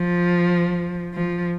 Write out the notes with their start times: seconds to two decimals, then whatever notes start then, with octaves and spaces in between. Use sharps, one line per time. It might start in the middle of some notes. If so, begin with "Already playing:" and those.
Already playing: F3
1.14 F3